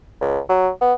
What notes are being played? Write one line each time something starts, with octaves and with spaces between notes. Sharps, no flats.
C#2
F#3
B3